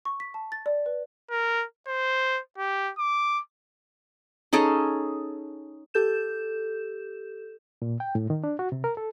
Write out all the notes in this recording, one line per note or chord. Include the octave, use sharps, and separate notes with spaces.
C#6
B6
A5
A6
D5
B4
A#4
C5
G4
D6
C#4 D#4 G#4 A4
G4 A4 G6 E7
A#2
G5
A2
D#3
D4
F#4
C3
A#4
A4